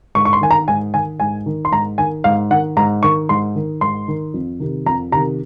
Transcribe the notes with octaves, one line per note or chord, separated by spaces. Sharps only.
G#2 C#6
C#6
C6
D#3 G#5
A#5
G#2 G#5
D#3 G#5
G#2 G#5
D#3
C6
G#2 A#5
D#3 G#5
G#2 F5
D#3 F#5
G#2 A#5
D#3 C#6
G#2 C6
D#3
G#2 C6
D#3
F2
C3 D#3
F2 A#5
C3 D#3 A#5